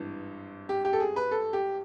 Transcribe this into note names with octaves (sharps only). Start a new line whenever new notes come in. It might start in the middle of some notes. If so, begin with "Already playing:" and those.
Already playing: G#1 G2 E3
G4
G4
A4
G#4
B4
A4
G4